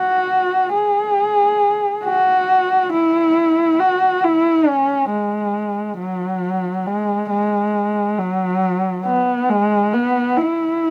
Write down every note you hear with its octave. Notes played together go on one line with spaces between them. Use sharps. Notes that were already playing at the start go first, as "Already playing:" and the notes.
Already playing: F#4
G#4
F#4
E4
F#4
E4
C#4
G#3
F#3
G#3
G#3
F#3
B3
G#3
B3
E4